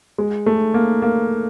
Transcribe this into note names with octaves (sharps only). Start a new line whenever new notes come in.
G#3
A3
A#3
A#3